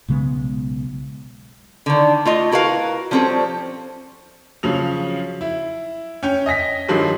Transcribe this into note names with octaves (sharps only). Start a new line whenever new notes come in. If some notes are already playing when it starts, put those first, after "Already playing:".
B1 C#3 G#3 B3
D3 D#3
A3 F4 D#5
E4 F#4 A#4 B4 F5
F3 G3 C4 C#4 A4
C#3 F3 F#3 F7
E4
C#4 C#5 G5
D#5 G#5 A#6 B6
G2 D#3 F3 F#3 G#3